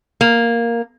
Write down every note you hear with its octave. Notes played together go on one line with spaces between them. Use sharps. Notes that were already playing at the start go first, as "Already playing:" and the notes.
A#3